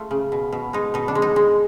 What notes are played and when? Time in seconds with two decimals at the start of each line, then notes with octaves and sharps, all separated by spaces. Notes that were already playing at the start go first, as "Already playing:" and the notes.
Already playing: A3 F4
0.11 C#3
0.32 B2
0.52 B2
0.73 G#3 D#4
0.94 B2 D#4
1.08 D4
1.15 G#3
1.22 D#4
1.36 G#3